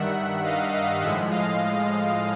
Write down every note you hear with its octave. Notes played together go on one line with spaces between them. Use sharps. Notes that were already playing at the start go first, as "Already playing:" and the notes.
Already playing: G2 D#3 G3 E5 F#5
D#5 F5
D#5 F5
A2 F3 G#3 E5 F#5
D#5 F5